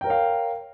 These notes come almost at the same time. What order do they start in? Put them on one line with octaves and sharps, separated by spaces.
G5 A#4 C#5 F5